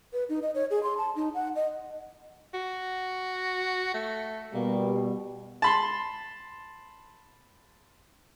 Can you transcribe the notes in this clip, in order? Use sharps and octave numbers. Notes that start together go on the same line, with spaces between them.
B4
D#4
D#5
C#5
G#4
C6
A5
D#4
F#5
D#5
F#4
A3
B2 G3 A#3
A5 B5 C6